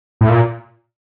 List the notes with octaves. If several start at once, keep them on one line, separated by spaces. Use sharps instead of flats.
A2
A#2